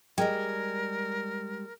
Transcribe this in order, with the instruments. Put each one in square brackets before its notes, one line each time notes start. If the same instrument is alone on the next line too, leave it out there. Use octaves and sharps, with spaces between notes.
[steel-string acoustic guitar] G3 G#3 [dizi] A#4 [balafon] D#5 G5